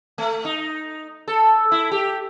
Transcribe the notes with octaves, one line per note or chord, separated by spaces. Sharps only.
A3
D#4
A4
E4
G4